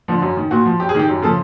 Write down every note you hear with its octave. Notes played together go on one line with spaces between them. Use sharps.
D3 F3
F#2
D#3
A#2 F#4
F3
F#2 G4
G#4
D#3 G4
F#2
C#3 F3 A4